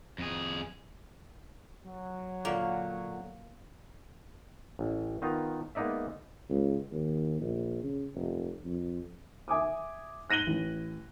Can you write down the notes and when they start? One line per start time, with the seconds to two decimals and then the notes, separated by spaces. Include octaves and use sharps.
0.18 F2 G#4
1.84 F#3
2.45 A#2 D3 A#3
4.79 A1
5.22 D#3 B3 D#4 F4
5.75 G#3 A#3 B3 D#4 D5 E5
6.49 C#2
6.91 D#2
7.40 A#1
7.83 C#3
8.14 F1
8.65 F2
9.48 E5 G#5 D6 D#6
10.30 F#6 A#6 D#7 F#7 G7
10.47 A1